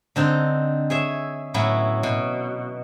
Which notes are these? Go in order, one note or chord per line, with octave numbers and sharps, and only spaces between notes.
D3 C4 D#4
G#4 C#5 E5
A2 F#3 B3 C#4 E4
B2